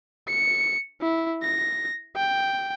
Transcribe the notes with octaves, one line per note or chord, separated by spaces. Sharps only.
C#7
E4
A#6
G5